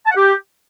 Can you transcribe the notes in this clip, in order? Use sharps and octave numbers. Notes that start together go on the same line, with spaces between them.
A5
F#5
G4